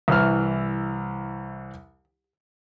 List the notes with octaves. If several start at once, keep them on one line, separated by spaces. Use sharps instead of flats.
C2 E3 F6